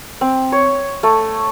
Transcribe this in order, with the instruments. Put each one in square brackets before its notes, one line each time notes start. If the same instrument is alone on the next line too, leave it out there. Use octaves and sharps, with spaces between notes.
[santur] C4
C#5
A3